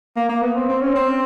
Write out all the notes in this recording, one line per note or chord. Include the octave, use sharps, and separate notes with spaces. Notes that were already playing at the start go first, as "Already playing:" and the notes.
A#3
A#3
B3
C4
C4
C#4
C4